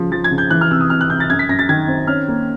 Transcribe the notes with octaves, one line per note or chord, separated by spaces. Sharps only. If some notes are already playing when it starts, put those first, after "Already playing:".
Already playing: C#3 F3
F3 A6
G#6
C#3
G6
E3 F#6
F6
C3 E6
D#6
C3 F6
F#6
C3 G6
A6
F#2 G#6
B6
F#2 A#6
A6
D#3 G#6
C4
C#4 F6
A#3